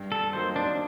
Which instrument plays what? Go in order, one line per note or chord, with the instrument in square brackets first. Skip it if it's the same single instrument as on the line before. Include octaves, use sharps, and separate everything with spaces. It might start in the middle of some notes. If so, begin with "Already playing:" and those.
Already playing: [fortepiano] G2
[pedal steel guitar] A4
[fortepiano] D#3 F#3 A#3 [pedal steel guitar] C5
[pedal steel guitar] D4